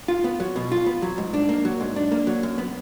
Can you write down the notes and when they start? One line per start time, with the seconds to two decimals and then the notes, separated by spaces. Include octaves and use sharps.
0.08 F4
0.24 B3
0.40 F#3
0.56 B2
0.72 F4
0.86 B3
1.02 F#3
1.18 G#2
1.34 D4
1.49 A#3
1.65 F#3
1.81 G#2
1.96 D4
2.12 A#3
2.27 F#3
2.43 F#2
2.58 B3